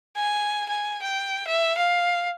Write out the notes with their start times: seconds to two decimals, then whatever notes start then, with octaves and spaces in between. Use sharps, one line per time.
0.17 G#5
0.69 G#5
1.02 G5
1.47 E5
1.77 F5